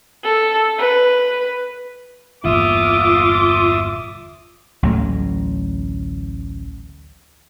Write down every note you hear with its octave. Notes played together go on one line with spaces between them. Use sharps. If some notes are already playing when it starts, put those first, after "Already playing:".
A4
B4
G1 E2 A#2 F4 E5 D6 D#6
A1 D2 F#3 A3